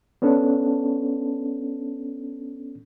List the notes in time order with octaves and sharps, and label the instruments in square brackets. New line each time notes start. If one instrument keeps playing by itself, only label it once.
[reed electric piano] B3 C#4 D4 A4